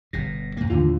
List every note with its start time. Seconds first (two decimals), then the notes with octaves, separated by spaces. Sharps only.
0.13 G1 B2 A#6
0.57 G2 A#3
0.70 D#2 A2 D3 E3 F4